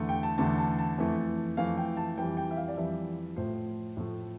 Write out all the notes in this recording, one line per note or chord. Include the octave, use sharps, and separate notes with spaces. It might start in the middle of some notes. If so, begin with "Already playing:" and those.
Already playing: E2 D3 A3
G5
A5
E2 D3 A3 A5
A5
A5
F2 E3 A3
F2 E3 A3 F5
G5
A5
F2 E3 G3 G5
G5
E5
F5
D5
F2 E3 G3 E5
A2 F3 A3 C5
A2 F3 A3